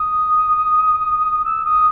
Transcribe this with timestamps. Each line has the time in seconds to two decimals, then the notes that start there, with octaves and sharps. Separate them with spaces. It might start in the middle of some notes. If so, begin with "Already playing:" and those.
Already playing: D#6
1.44 E6
1.64 D#6